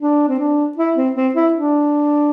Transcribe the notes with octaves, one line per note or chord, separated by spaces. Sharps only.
D4
C4
D4
E4
C4
C4
E4
D4